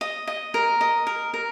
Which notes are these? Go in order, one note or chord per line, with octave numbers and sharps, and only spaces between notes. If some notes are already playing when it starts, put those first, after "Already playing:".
D#5
D#5
A#4
D#5
A#4
A#4